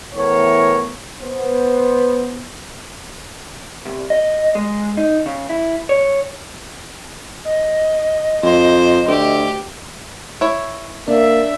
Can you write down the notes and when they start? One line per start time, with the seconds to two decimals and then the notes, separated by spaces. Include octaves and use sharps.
0.15 A2 E3 B3 A#4 C#5
1.21 B3 C5
3.86 C2
4.10 D#5
4.55 G#3
4.97 D#4
5.26 C#3
5.49 E4
5.89 C#5
7.45 D#5
8.43 F2 C5
9.08 D2 G4
10.41 E4 C#5
11.08 A#3 D4 E5